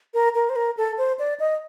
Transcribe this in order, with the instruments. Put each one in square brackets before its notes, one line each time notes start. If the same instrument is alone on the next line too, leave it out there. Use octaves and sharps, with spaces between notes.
[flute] A#4
A#4
C5
A#4
A4
C5
D5
D#5